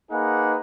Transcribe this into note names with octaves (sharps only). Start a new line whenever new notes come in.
A#3 D#4 G#4 B4 F#5